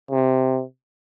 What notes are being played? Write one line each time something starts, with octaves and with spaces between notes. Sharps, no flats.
C3